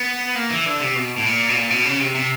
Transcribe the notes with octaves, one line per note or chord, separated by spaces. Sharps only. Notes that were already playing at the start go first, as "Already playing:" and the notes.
Already playing: B3
A#3
E3
D3
C3
B2
A2
A#2
B2
A#2
B2
C#3
C3
C3